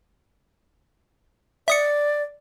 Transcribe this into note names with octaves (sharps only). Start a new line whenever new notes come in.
D5 E5 D#6 C#7